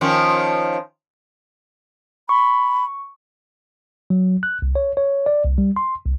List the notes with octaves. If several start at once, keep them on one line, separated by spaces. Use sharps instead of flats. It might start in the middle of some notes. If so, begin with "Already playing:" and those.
D#3 F3 C#4
B5 C#6
F#3
F#6
C2
C#5
C#5
D5
C2
G3
C6
C2